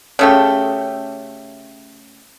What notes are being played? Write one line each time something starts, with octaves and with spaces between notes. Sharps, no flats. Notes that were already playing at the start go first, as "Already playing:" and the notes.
C#3 A3 G4